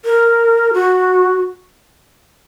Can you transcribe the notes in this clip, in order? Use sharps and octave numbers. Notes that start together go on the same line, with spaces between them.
A#4
F#4